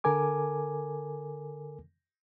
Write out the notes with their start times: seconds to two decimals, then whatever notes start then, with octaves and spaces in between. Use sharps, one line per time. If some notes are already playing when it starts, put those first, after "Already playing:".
0.04 D3 A4 A#4 G#5 D6